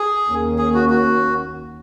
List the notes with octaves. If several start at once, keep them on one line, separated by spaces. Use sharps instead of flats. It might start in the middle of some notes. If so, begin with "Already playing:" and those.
Already playing: G#4
D#2 D#3 A#3 C#4
G#4
F#4
F#4